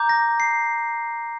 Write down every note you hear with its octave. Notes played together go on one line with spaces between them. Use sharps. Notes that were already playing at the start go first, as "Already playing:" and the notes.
Already playing: A#5 D6 G6
A#6
C7